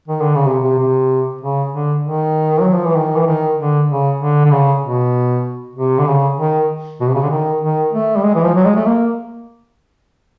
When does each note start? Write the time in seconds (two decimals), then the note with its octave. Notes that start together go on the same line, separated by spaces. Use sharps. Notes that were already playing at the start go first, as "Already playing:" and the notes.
0.08 D#3
0.21 D3
0.35 C#3
0.47 C3
0.63 C3
0.79 C3
1.41 C#3
1.72 D3
2.03 D#3
2.62 F#3
2.74 F3
2.85 E3
2.96 D#3
3.17 E3
3.26 D#3
3.58 D3
3.89 C#3
4.20 D3
4.45 D3
4.51 C#3
4.82 B2
5.76 C3
5.99 D3
6.07 C#3
6.37 D#3
7.01 B2
7.08 C3
7.15 C#3
7.23 D3
7.30 D#3
7.61 D#3
7.93 A3
8.17 G3
8.24 G#3
8.35 E3
8.44 F3
8.55 F#3
8.65 G#3
8.75 A3
8.85 A#3